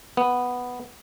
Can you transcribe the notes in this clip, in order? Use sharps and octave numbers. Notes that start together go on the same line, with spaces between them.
B3